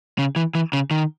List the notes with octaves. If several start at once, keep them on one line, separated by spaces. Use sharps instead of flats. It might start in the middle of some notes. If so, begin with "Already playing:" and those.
C#3
E3
E3
C#3
D#3